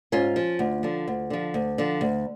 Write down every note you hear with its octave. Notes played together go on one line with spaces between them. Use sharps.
G#2 C#4 F4
F3
D2
D3 F3
D2
D3 F3
D2
D3 F3
D2